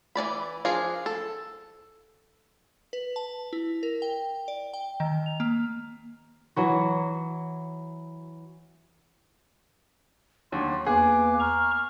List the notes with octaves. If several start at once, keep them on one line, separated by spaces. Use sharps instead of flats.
E3 D4 D5 B5
F3 D4 G#4 A#4
A4
B4
A5
E4
A#4
G5
D5
G5
D#3
F7
A#3
E3 F#3 F#4
D#2 F#3 D4 C6
E2 A#3 G#4 B4 D6
A#5 C#6 F6